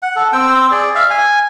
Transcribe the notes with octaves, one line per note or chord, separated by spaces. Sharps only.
F#5
A4
C4 G5 E6
G#4 D5
E5 F5
G#5